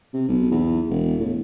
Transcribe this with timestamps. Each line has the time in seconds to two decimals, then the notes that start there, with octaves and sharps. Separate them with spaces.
0.14 C3
0.28 B1
0.51 E2
0.90 E1
1.19 A2